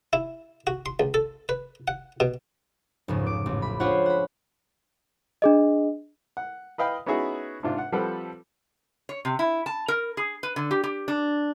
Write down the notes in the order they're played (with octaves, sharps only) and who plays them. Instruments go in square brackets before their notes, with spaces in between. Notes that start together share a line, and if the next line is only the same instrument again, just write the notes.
[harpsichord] E4
F#4
C6
C#2
A4
B4
F#5
B2
[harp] F1 C#2 G#2
D6
A1
B5
D4 F4 G#4 C5 C#5 F#5
F#5 B5
[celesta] D4 G#4 D#5
[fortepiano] F#5
B4 D#5 F5 G5 B5 D#6
B3 C#4 D#4 E4 F#4 G#4
G#2 C3 D4 F4
F#5
F3 G3 C4 A4 B4 F#5
[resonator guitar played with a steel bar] C#5
C3
E4
A5
A#4
G#4
B4
D3
G4
G4
D4